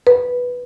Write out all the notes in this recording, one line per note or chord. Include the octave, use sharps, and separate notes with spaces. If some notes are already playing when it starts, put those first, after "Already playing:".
B4